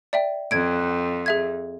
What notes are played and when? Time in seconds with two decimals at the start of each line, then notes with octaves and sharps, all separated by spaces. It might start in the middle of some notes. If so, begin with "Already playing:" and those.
0.13 D5 E5 G5
0.51 F2 G#6 D7
1.26 G#4 E5 G#6